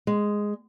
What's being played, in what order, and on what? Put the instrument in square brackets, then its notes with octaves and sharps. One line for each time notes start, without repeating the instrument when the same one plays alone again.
[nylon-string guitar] G#3